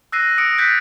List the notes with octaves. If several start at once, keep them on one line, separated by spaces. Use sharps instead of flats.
E6 F#6 A#6 C7 D#7
D#6 C#7 D7
F#6 G6 A6 B6